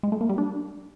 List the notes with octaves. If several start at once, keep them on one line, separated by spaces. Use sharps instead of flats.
G#3
A3
A#3
G3
D4